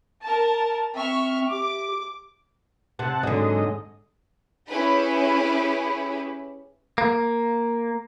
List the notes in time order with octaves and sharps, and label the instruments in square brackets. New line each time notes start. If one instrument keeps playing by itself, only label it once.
[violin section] A#4 A5
[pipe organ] C4 [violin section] E5 C#6 F6
[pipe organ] G4 [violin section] D6
[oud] C3 [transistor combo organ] F#5 A5
[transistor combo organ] G#2 D#5 [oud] D3 F#3
[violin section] C#4 E4 G4 G#4 B4 B5
[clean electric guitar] A#3